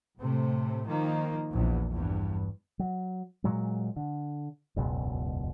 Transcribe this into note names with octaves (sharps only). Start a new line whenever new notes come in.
A2 C3 A3
D#3 F3 A#3
A#1 E2
E2 G2
F#3
A#2 F#3 G#3
D3
E1 C#2 F#2 B2